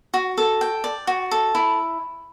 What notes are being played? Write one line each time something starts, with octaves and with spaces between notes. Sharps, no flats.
F#4
A4
G5
D5
F#4
A4
E4